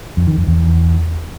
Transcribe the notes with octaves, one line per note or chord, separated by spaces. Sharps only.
F2
D#3
F2
E2